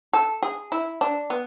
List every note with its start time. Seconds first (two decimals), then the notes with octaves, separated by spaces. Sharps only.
0.13 A4
0.43 G#4
0.72 E4
1.01 D4
1.30 B3